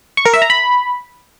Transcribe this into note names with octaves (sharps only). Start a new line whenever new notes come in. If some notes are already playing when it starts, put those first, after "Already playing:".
C#6
A#4
E5
A#5
B5